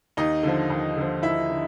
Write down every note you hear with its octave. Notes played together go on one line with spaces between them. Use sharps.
D#2 D#4 D#5
D3 F3
D#2
D3 F3
D#2 E4 E5
D3